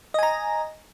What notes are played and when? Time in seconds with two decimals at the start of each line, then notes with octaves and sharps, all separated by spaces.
0.14 D#5
0.19 G#5
0.23 A#5